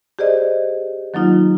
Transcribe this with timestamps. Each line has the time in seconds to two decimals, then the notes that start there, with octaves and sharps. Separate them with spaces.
0.19 G4 G#4 C5 D5 D#5
1.14 D#3 F#3 A#3 D#4 F4